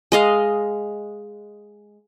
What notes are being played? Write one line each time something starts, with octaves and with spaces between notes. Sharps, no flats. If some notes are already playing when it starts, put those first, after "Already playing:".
G#3 D#5 F5